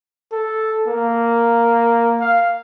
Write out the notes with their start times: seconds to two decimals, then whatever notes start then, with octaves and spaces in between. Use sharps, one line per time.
0.32 A4
0.88 A#3
2.20 F5